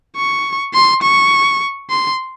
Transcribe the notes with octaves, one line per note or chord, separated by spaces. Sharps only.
C#6
C6
C#6
C6